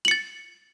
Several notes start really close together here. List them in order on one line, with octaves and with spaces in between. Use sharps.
F#7 C#7 A6